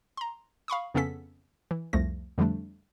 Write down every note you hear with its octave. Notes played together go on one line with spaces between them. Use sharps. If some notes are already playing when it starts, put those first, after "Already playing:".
A#5 C6
F5 B5 C#6 D#6
F2 C#3 B3 C#4 A4 B6
E3
C2 F2 F3 A3 A#6
F2 D3 F3 G3 A3 D4